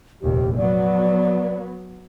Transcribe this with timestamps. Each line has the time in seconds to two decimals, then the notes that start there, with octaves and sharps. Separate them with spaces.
0.22 F1 A#1 D#2 G4
0.57 F#3 B3 D5